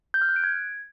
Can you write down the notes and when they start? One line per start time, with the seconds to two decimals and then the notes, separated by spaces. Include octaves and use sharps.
0.14 G6
0.22 F6
0.29 F#6
0.36 D7
0.44 G#6